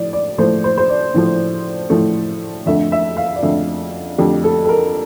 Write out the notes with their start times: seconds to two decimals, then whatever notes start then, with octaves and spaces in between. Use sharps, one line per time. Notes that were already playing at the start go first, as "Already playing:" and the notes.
Already playing: A2 F3 D5
0.13 D5
0.38 A2 F3 A3 C5
0.64 C5
0.77 C5
0.89 D5
1.14 A2 F3 A3
1.90 A2 F3 A3
2.66 F2 D3 A3 E5
2.92 E5
3.17 F5
3.36 D5
3.42 F2 D3 A3 E5
4.18 F2 D3 A3 G4
4.44 A4
4.65 A4
4.69 A#4